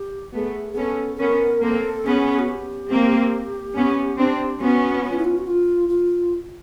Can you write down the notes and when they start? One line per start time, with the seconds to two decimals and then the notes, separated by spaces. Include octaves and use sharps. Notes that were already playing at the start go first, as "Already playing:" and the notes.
Already playing: G4
0.34 A3 B3 G#4
0.72 G#4
0.76 B3 C#4 A4
1.15 A4
1.19 B3 C#4 A#4
1.62 A#3 C4 A4
2.05 B3 C#4 G#4
2.38 F#4
2.48 G4
2.90 A#3 C4
3.75 B3 C#4
4.18 C4 D4
4.60 B3 C#4 F#4
5.03 F#4
5.10 F4
5.17 E4
5.24 F4
5.37 F#4
5.46 F4
5.88 F4